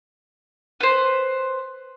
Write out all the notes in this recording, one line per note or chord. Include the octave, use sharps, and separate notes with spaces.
B4 C5